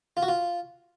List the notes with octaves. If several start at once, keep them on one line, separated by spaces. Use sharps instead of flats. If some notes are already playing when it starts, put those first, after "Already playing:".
F4
F#4
F4